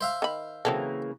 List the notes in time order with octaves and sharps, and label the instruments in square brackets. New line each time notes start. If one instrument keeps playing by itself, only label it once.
[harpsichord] C5 E5 F5
[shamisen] D#3 B5
[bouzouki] C#3 E3 A#3 [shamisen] F#3 C4 A4